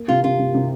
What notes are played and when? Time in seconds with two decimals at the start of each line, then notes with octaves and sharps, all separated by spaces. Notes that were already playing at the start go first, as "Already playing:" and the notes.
Already playing: A#3
0.08 C3 F4
0.24 C3 F4
0.39 C3
0.54 C3